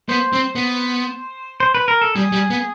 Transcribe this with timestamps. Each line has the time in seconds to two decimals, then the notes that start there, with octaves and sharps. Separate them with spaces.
0.09 B3 C5
0.33 C4
0.55 B3
1.60 C5
1.75 B4
1.88 A#4
2.02 A4
2.15 G3 G#4
2.32 G3
2.50 B3